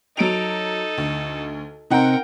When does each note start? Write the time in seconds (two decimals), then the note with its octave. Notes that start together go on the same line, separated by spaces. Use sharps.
0.17 F#3 D#4 A4 D7 F7
0.98 D2
1.91 C3 C4 D#4 A#4 F#5 G5 A#5